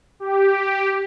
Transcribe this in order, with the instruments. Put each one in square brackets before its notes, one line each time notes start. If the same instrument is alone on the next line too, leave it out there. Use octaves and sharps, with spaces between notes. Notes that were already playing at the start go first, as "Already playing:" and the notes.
[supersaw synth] G4